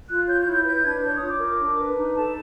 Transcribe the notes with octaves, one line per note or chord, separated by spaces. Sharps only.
F4 F#6
C#5 G6
G6
E4
G6
B4 G6
D4 G#6
C#5 G6
D#6
F4
D6
A#4
D4
B4
D#4
A4 A5